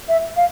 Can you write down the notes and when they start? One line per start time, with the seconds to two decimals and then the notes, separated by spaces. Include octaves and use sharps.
0.09 E5
0.37 F5